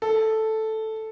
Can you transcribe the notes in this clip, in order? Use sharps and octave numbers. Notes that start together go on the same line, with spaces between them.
A4